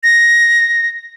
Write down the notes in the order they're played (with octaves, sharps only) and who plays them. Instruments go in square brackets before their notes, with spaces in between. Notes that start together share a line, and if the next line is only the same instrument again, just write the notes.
[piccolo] A#6